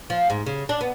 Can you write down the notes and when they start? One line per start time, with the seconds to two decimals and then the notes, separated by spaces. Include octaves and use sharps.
0.10 F3
0.30 G#2
0.46 C#3
0.69 D4
0.81 B3